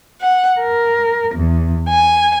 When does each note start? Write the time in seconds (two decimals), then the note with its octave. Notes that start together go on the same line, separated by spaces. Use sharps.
0.20 F#5
0.60 A#4
1.34 E2
1.89 G#5